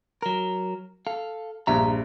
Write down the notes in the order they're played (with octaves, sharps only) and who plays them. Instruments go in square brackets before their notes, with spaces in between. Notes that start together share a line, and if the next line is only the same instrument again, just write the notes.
[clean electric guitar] F#3 A#4
A4 F5
[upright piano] A#1 G2 [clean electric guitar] E5 A#5